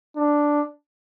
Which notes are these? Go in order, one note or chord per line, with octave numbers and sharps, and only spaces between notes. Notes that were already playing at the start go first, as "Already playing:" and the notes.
D4